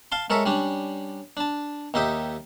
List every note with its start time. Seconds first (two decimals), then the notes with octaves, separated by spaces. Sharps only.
0.12 F5 A5 C6
0.30 G#3 A4 A#4 C#5 E5
0.46 G3 C#4 D4
1.37 D4 A5
1.94 D#2 D#4 G4 E5 D#6